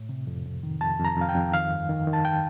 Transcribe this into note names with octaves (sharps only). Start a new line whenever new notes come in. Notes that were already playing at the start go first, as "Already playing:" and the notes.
Already playing: A2
C3
F2
F2
D#3
F2 A5
F2
A#5
F2 F5
G5
F2
D#3 F5
G2
D#3
D#3
A5
G5